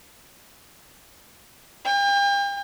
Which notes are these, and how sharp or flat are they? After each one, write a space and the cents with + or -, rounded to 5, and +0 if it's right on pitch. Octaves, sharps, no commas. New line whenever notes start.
G5 +40